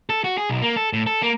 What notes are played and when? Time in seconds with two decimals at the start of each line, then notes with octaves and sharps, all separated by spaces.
0.10 A4
0.24 F#4
0.38 G#4
0.50 B1
0.62 A#3
0.76 A4
0.93 A2
1.07 A4
1.22 A#3